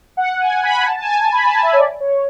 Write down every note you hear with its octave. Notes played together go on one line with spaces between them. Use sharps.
F#5
G#5
B5
A5
A5
G#5
B5
A5
E5
C#5
D5
C#5